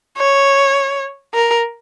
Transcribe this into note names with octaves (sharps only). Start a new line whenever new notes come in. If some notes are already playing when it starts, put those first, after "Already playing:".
C#5
A#4